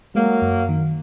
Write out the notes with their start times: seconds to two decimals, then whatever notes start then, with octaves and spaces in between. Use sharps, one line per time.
0.14 F#3 G#3 A#3
0.42 F#2
0.69 D#3